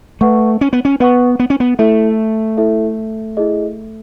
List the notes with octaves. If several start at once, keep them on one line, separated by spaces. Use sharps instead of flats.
A3 B4 F#5 C#6
C#4
B3
C#4
B3 B4 F#5 C#6
B3
C#4
B3
A3 E4 A4 E5
E4 A4 E5
E4 G#4 D#5